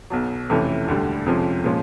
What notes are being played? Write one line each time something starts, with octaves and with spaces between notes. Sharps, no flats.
B1 B2 F#3
F2 C3 E3 A3 C#4
E1 D2 D3 G3
F2 C3 F3 G#3 C#4
A#2 F3 G#3 C#4